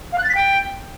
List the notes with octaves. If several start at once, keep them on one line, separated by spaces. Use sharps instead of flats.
F5
F#6
A6
B6
G5